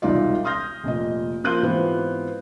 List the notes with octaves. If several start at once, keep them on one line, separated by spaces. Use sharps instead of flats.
E1 C2 D#4 F4 D5
C6 D#6 F6 G6 A#6
F1 A#2 D#5
F3 A#3 C6 F#6 G6 D#7
G#2 E3 B3 C4 F4 G4